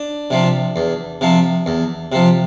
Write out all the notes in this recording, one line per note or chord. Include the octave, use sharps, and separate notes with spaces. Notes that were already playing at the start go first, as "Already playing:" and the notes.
Already playing: D4
C3 F3
E2
C3 F3
E2
C3 F3